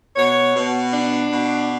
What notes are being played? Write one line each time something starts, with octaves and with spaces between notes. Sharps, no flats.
B2 C#5
B2
D4
B2